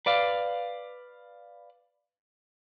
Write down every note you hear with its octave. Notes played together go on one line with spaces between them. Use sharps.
B4 D5 F5